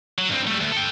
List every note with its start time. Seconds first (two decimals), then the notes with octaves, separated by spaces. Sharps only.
0.18 F#3
0.29 G2 C4
0.47 G3 A3
0.60 D2
0.72 A4 G5